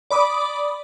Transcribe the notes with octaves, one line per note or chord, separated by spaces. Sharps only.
D5 B5 D6 D#6